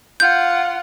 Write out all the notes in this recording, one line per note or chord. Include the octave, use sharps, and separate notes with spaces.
F4 F#5 G6